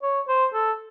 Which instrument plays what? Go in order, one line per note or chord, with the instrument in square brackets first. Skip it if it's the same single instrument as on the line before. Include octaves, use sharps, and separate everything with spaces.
[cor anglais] C#5
C5
A4